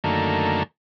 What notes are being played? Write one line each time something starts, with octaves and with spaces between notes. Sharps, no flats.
F#2 D3 D#3 A3 A#3